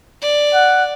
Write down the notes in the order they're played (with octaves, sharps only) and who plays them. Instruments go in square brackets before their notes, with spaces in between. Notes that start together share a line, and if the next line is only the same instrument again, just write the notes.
[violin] D5
[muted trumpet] F#5